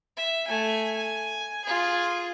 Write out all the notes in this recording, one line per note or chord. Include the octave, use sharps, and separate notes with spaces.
E5
A3 G#5
G#5
F4 G#4